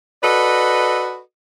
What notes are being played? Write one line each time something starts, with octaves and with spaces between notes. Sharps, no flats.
F#4 A4 B4 D5 D#5